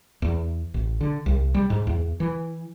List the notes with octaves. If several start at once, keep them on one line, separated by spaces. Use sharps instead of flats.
E2
A1
D3
C2
G3
G#2
E2
E3